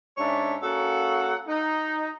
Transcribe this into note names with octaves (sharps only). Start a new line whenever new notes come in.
G#2 C#4 D4 C#5 E5
A#3 C#4 F#4 A4 F5 F#5
D#4